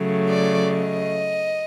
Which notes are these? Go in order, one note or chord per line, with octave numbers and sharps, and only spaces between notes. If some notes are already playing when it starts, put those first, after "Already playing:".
Already playing: C#3 F#3 A3
D5
D#5